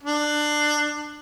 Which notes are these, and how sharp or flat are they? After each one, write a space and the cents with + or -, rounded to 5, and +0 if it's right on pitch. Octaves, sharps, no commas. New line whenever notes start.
D4 +20